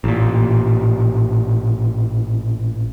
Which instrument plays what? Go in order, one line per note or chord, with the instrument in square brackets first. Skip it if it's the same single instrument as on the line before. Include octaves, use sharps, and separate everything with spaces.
[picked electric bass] A1 A#2